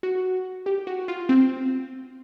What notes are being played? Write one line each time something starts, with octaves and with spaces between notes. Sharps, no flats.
F#4
G4
F#4
F4
C4